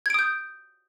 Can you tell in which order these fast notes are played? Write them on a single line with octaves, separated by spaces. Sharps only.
G#6 D7 D#6 G6